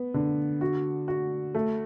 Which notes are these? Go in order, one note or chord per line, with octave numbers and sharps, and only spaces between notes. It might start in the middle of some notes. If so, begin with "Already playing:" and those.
Already playing: B3
D3
F#4
F#4
A3